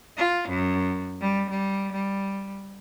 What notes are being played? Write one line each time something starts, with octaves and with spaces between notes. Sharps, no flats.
F4
F#2
G3
G3
G3